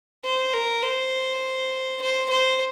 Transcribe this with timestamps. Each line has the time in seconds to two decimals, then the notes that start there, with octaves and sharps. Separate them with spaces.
0.24 C5
0.53 A#4
0.83 C5
2.01 C5
2.30 C5